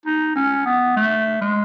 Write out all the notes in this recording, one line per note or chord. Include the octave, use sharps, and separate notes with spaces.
D#4
C#4
B3
A3
G#3